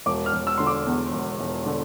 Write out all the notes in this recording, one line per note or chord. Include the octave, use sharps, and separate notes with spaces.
E1 D6
F6
E1
E6
D3 C6
D6
E2
E1
E1
D3